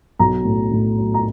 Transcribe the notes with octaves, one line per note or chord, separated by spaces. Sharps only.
B1 A#5
A2
A2
F#3
A#5